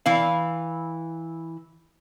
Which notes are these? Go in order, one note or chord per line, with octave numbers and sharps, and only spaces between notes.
E3 E4 F5